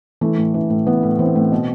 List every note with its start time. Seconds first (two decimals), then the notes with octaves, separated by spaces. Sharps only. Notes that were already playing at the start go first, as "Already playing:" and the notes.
0.21 E3 A3
0.38 A2
0.54 E3
0.70 A2
0.87 E3 B3
1.03 A2
1.19 E3 C4
1.35 A2
1.52 B2